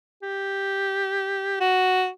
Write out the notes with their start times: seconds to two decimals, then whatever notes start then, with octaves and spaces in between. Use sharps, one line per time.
0.23 G4
1.60 F#4